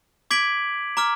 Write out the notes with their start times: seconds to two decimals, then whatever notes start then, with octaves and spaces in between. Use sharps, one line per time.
0.31 D6 G#6 B6 D7 F#7
0.97 A#5 D6 F6